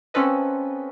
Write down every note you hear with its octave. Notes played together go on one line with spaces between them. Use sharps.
C4 C#4 F4 A4 B4 D#5